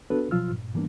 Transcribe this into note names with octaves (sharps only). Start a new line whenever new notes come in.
B3 D4 F#4 A4 B4
B2 F3 F#3 F4 E6 F6
G2 A#2
G#2 E3 G3 A#3 B3 D4